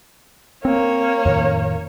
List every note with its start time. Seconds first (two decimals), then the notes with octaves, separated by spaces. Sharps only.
0.65 A#3 C4 C#5
1.26 F2 A2 D#3